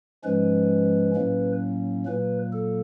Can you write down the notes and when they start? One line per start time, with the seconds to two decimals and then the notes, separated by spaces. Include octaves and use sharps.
0.24 G#2 F3 G#3 C#4 B4
1.15 A2 F#3 A#3 C#4
2.07 A#2 F#3 A#3 B4
2.53 A4